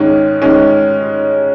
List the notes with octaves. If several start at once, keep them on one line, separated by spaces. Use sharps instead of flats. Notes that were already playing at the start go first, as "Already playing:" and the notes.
Already playing: G#2 D#3 G#3 C#4
G#2 D#3 G#3 C#4